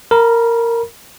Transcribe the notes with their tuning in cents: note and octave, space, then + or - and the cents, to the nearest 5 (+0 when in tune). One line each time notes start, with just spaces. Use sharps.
A#4 -10 B5 -35